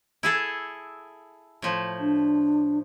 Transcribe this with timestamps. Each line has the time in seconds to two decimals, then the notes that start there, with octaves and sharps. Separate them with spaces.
0.23 E4 G#4 A4
1.62 A2 F3
2.00 D4